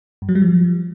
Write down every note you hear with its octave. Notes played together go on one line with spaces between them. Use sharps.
G2
F#3
G3
F3